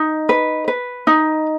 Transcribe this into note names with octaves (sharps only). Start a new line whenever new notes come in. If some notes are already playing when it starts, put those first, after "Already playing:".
Already playing: D#4
B4
B4
D#4